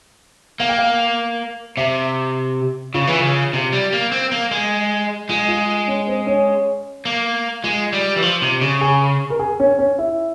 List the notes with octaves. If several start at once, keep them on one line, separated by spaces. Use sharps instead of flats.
A#3 F5
G5
F5
C3 E5
C#3 F4
E3
C#3
C3
G3
A#3
C4
A#3
G#3
G#3 F4
F4
C#4
C4
C#4
A#3
G#3 F4
G3
E3
F3
C3
C#3
G#4
A#4
G#4
C#4
C#4
E4